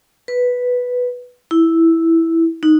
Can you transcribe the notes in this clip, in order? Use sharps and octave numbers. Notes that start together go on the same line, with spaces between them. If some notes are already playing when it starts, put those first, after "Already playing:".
B4
E4
D#4